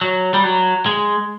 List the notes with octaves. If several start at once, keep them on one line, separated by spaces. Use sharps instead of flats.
F#3
G3
F#3
G#3